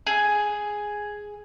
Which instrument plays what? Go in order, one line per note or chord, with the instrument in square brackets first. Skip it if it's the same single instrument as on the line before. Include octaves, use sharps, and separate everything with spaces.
[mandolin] G#4